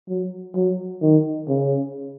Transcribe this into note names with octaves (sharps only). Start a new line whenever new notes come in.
F#3
F#3
D#3
C#3